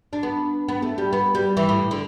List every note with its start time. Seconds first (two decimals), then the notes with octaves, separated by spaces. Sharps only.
0.13 D4
0.23 B3
0.68 B3
0.82 A3
0.98 G3
1.13 B3
1.35 G3
1.57 E3
1.69 A2
1.91 D3